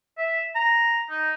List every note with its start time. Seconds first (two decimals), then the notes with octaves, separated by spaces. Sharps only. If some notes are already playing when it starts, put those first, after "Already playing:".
0.18 E5
0.55 A#5
1.10 D#4